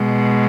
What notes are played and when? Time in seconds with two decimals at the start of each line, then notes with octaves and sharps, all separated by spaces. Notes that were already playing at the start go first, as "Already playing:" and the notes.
Already playing: B2 G#3